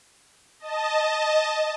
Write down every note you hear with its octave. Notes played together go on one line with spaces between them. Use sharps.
D#5 A5